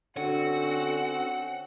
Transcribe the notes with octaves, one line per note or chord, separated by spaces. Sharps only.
D3 C4 C#4 F#4 F#5